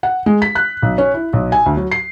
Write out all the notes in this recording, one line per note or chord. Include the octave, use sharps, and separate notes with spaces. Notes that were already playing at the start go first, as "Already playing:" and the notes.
F#5
G#3
B6
F#6
B1
C#4
E4
B1
G#5
D2
F#3
C7